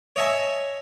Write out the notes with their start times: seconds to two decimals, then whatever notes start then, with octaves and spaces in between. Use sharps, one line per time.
0.16 C#5 D#5 E5 G#5 A5